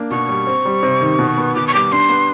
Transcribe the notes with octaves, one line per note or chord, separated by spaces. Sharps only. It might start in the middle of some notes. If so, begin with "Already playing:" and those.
Already playing: A#3 D4
B2 C#6
G3
C4
G3
C3
D#3
B2
B3
B2 D6
C#6
G3 D6
D4 C6
B3